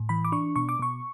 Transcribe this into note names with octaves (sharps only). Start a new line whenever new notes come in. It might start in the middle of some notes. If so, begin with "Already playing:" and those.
Already playing: A2
E3 B5
D6
D4 C#6
B2 C#6
D6
B2 C#6